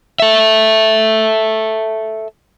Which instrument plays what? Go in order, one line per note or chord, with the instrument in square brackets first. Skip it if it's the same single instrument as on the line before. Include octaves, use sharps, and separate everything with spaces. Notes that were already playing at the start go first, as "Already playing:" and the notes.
[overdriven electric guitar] A4 E5